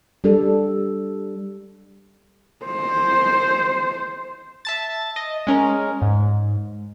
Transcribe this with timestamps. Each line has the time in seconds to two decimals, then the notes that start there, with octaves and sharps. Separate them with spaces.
0.24 G3 D4 G4 A4
2.65 C5
4.65 E5 A5 A6
5.16 D#5
5.47 G#3 C#4 A#4
6.02 G#2